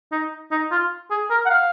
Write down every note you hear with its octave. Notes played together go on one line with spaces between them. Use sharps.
D#4
D#4
F4
G#4
A#4
F#5
F5